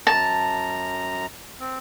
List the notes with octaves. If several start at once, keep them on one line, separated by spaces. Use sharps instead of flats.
F#2 A5 A#5
C4